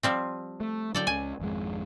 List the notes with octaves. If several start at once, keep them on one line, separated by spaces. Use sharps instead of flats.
F3 G3 C4
A3
D3 F#3 A4 D5 G5
C#2 C#3 G#5
G#1 F2 G#3